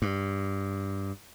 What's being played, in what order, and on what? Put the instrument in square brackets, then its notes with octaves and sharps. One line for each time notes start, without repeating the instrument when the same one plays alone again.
[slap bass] G2